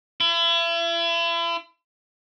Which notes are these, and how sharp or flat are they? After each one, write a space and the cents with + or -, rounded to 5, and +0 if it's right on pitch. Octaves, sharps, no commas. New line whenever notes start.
E4 +40